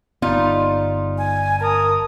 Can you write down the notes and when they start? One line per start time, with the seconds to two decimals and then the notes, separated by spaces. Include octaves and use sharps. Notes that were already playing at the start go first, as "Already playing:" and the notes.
0.22 G1 G3 B3 D#4 F4
1.18 G#5
1.60 A#4 A5 D#6